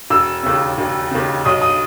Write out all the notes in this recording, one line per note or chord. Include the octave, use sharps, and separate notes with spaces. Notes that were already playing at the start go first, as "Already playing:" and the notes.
E1 E6
D#2 C#3
E1
D#2 C#3
B1 D#6
D#6